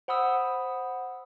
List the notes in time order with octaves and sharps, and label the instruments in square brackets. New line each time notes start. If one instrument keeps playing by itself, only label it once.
[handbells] C5 F#5 B5 D#6 E6